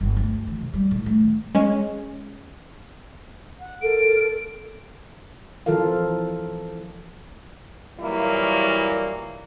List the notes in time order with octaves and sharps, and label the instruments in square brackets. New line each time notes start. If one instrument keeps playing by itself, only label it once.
[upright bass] G1
D2
E3
C3
G3
A2
A3
D#3
[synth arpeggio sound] G#3 C#4
[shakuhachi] F#5
[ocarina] A4 [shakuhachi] A#4 [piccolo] D7
[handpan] E3 F3 F4 A4 A#4 F5
[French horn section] A#2 E3 F#3 G3 A#3 E4